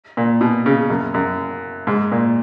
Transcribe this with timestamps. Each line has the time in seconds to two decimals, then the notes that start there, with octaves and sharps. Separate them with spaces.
0.17 A#2
0.41 B2
0.66 C#3
0.90 F#2
1.14 F#2
1.87 G#2
2.12 A#2